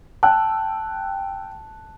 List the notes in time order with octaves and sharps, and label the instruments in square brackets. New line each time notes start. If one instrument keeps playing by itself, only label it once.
[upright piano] G5 E6 F#6 [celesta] A5